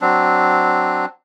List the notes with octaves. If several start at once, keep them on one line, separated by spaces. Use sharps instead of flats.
F#3 C4 D4